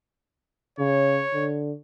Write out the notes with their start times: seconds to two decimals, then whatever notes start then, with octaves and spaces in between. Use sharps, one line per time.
0.79 C#3 C#5
1.34 D3